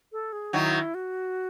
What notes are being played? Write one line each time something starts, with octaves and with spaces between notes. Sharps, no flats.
A4
G#4
D#3 F#3 E4
F#4